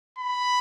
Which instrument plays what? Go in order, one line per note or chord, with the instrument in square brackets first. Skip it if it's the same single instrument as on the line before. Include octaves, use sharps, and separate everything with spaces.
[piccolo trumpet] B5